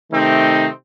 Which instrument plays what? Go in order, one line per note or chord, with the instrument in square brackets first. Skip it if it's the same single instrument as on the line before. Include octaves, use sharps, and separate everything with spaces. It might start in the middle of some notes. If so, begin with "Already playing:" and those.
[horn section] C3 D#3 A3 C4 D#4